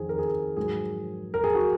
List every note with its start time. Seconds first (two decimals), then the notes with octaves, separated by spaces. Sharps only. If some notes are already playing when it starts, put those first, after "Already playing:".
Already playing: F2 D#3 G#4
0.09 A#4
0.18 G#4
0.57 G#2 F#3 G#4
1.34 A#4
1.44 G#4
1.55 F#4